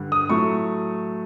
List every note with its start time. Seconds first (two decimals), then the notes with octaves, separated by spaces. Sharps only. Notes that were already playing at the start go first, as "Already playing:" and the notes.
Already playing: G2 D3 G3
0.12 D#6
0.29 A2 F#3 A3 C#6